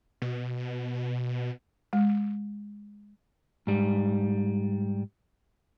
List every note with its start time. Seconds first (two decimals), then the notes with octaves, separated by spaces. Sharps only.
0.22 B2
1.93 G#3
3.67 G#2 G3